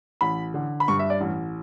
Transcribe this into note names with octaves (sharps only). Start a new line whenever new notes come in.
A1 B5
D3
B5
G2 C#6
E5
D5
A1